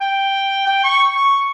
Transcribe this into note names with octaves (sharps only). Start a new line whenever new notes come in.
G5
G5
C#6
C#6